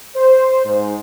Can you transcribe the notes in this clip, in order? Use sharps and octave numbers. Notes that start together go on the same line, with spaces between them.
C5
G#2